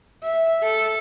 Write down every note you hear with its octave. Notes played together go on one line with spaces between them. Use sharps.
E5
A4